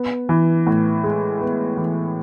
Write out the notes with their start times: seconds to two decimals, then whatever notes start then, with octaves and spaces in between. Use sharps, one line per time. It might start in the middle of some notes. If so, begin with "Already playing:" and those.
Already playing: B3
0.29 E3
0.67 A2
1.04 G#3
1.41 B3
1.77 E3